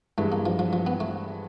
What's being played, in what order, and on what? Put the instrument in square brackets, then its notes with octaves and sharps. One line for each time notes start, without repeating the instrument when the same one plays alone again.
[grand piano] G2 E3 G#3 [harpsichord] A3
[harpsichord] A#3
F3
F3
F3
B3
A3